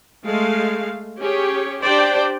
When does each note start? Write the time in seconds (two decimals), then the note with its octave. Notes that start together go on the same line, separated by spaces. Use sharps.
0.24 G#3 A3 F5
1.18 C#4 G4 G#4 C#5
1.82 D4 G4 C5 D5 G5